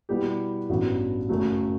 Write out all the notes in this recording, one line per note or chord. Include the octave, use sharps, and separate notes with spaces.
B2 G3 B3 E4 G4
A1 G2 F#3 B3 F#4
F#1 F#2 F#3 A3